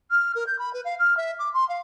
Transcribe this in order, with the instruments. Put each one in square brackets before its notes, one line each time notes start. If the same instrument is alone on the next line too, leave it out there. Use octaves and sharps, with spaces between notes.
[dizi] F6
A#4
G6
B5
B4
F5
F6
E5
D6
C6
F5